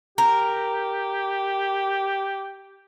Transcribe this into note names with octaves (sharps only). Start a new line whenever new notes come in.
G4 A#4